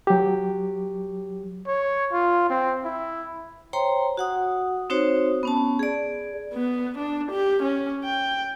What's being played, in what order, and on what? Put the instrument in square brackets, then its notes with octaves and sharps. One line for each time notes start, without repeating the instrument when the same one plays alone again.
[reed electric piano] F#3 G4
[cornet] C#5
F4
C4
E4
[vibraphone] C5 C#5 G5 A#5 C6
F#4 F#5 D#6
C4 D#4 F#4 C5 C#5
B3 C#4 A5
G#4 D5
[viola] B3
D4
G4
C#4
G5